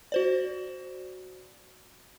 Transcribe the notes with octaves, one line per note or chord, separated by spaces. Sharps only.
F#4 C5 D5